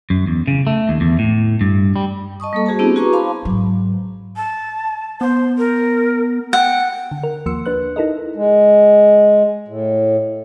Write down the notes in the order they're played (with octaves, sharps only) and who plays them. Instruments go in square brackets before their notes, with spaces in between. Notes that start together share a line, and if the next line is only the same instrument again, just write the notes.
[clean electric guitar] F#2
E2
C#3
A3
D#2
E2
A2
G2
G3
[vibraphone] D#5 A5 C#6 D#6
G3 A#3 A4
F#4 G#4 C5 A5
B3 C4 D4 E4 G4
F#4 G#4 B4 A#5 C#6 D6
C5 F5 A5 B5 C6 D6
[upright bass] G#2 F#3
[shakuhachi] A5
[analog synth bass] B3 [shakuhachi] C5
[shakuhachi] A#4
[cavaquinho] F#5 [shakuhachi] G5
[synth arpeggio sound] D3
A#4
D#2 F3 A#3 C6 E6 C#7
D4 B4 F#6
D#4 E4 A4 A#4 D#5
[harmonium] G#3
A2